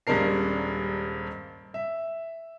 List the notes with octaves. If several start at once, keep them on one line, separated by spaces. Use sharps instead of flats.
D#1 G2 G#3 D4 A#4 C7
E5